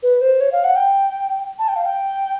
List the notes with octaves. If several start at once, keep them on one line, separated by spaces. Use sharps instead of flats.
B4
C5
C#5
F5
F#5
G5
A5
G5
F5
G5